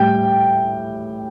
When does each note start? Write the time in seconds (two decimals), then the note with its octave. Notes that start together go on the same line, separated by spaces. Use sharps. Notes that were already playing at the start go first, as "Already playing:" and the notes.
Already playing: A2 G3 G5